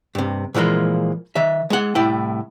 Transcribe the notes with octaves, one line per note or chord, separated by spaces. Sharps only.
G2 C3
A#2 E3 F3 G#3 A#3
D#3 E5
G#3 F#5
C2 A2 E4 G5